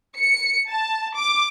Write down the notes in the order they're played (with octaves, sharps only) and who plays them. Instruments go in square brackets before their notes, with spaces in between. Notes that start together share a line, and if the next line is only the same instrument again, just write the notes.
[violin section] C#7
A5
D6